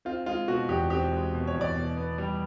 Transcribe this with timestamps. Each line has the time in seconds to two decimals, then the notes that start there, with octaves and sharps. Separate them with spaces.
0.05 C4 F4
0.26 G#3 F4
0.48 B2 F#4
0.69 E2 G4
0.90 C4 G4
1.12 G#3
1.34 B2
1.47 C#5
1.54 E2
1.61 D5
1.76 B2
1.97 B3
2.18 G3